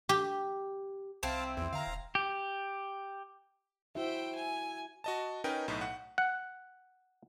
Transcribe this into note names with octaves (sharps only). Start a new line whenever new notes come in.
G4
C2 C4 E4 F5 A5
E2
D3 F5 A#5
D#1
G4
E4 F#4 C5 E5 G5
G#5
F#4 D#5 A5
C#4 D#4 A#4 B4 D#5 G5
B1 A2 D#4
F#5
F#5